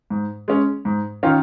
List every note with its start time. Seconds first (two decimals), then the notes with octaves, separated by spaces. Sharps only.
0.10 G#2
0.48 G#3 C#4
0.85 G#2
1.23 D#3 C#4 F4